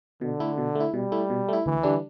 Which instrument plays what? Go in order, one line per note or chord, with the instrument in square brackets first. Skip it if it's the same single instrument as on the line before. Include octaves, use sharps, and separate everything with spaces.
[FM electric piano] B2 [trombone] D3
[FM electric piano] A3 E4
B2
A3 E4
[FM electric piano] B2 [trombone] G3
[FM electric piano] A3 E4
B2
A3 E4
[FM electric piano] D2 [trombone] E3
[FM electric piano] D3 G3 D4